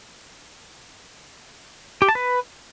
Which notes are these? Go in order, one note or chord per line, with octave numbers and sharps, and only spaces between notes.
G4
A5
B4